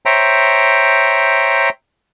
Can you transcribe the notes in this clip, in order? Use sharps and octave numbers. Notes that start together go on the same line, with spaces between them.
C5 C#5 E5 G5 A#5